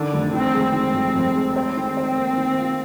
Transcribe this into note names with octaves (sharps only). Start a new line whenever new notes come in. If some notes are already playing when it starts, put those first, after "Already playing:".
Already playing: D3 D#3
F1
D#3 C4
G#3
D#3 C4
F2
F2
G#3
C4 C5
D#3
C5
A#3
D#3
F4